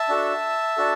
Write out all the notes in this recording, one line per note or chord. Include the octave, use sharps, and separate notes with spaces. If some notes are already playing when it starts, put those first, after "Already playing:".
Already playing: E5 A5
D4 F#4 A4
D4 F#4 A4